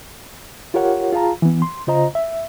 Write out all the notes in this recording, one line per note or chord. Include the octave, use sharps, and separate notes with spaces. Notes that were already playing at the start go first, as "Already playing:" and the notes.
F4 G4 A#4 C#5 F#5
F4 G#4 F5 A5 A#5
E3 B3
C6
C#3 F4 C5 D#5 A#5
E5